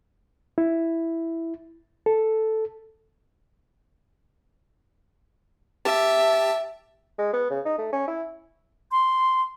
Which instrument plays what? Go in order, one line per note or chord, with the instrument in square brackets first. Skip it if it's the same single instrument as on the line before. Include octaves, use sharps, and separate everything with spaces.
[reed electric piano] E4
A4
[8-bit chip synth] G4 A5 [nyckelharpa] E5
[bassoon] G#3
B3
C#3
D#4
A3
C#4
E4
[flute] C6